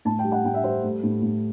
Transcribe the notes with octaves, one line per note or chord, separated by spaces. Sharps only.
A2 A5
G5
G3
F#5
A2 G5
E5
G3 C5
A3
A2
A2